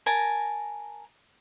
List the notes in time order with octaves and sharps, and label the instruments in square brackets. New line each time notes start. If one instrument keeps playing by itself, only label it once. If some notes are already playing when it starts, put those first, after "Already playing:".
[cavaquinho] A#4 G#5 A5